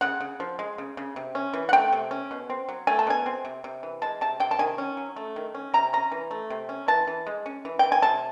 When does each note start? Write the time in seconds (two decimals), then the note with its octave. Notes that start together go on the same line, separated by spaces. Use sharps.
0.01 C#3 F#5
0.21 C#3
0.40 F3
0.59 G#3
0.78 C#3
0.97 C#3
1.16 C3
1.35 C#4
1.54 E3
1.69 F#5
1.73 A3 G5
1.92 C3
2.11 C#4
2.31 B2
2.50 C4
2.69 F#3
2.87 A3 G#5
2.99 A5
3.07 B2 G#5
3.26 C4
3.45 C3
3.64 C3
3.83 E3
4.02 G#3 A5
4.21 C3 A5
4.40 C3 G5
4.51 A5
4.59 D#3 G#5
4.78 C#4
4.97 F#3
5.16 A3
5.36 D#3
5.55 C#4
5.74 C3 A#5
5.93 C#4 A#5
6.12 E3
6.31 A3
6.50 C3
6.69 C#4
6.88 E3 A5
7.07 E3
7.27 G#3
7.46 C#4
7.65 E3
7.79 E3 G5
7.92 G#5
8.02 C3 A5